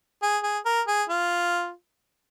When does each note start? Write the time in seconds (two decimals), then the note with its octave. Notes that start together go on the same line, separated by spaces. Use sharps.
0.23 G#4
0.43 G#4
0.66 A#4
0.88 G#4
1.10 F4